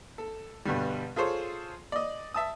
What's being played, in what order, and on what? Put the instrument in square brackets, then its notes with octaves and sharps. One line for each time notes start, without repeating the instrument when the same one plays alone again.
[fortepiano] A4
G2 B2 D3 G3
F4 G#4 A4 C5 C#5
D5 D#5
E5 A5 D#6